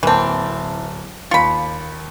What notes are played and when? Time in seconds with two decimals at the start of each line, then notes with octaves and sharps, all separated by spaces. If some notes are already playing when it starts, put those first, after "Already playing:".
0.03 D1 E3 A#3 C4 A5
1.31 D#2 F4 B5 C#7